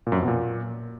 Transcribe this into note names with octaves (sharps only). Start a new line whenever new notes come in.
A#2
F#2
F2
B2
A#2